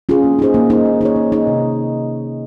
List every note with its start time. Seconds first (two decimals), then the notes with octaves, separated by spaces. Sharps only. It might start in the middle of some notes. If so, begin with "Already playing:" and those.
0.09 C#4 F4 G#4
0.24 A#3
0.39 D#4 G#4 C5
0.54 A#3
0.70 D#4 G#4 C5
0.85 A#3
1.01 D#4 G#4 C#5
1.16 A#3
1.32 D#4 G#4 C#5
1.47 C3